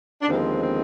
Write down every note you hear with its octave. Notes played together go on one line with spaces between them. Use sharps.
D4
D#2 D3 F3 G#3 B3 C4
C4